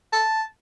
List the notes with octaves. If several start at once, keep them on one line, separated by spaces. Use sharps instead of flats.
A5